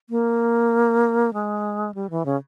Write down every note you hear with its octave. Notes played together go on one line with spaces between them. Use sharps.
A#3
G#3
G3
E3
C#3